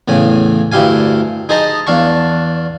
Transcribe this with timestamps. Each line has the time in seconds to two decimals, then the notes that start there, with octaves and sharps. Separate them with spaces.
0.08 E2 A2 C#3 G#5
0.72 D2 G2 E4 G4 F5 G#5
1.49 D#4 G#4 C5 D#5 A5 A#5
1.87 E2 D4 F5 A5 C#6